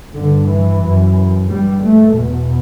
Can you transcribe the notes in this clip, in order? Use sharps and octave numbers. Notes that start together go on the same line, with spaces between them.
G2 D3
E3
F#2
G2 G3
A3
E2 B2